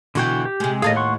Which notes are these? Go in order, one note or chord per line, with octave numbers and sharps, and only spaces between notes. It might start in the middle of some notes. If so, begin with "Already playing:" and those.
B2 D3 E3 F#4 G5
G4
C3 G#3
D#2 A2 G#4 A4 D#5 F5
F#5 C6 C#6